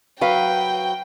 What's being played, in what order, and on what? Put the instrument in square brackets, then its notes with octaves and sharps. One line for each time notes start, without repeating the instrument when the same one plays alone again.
[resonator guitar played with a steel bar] F#3 B4 F5 [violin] G5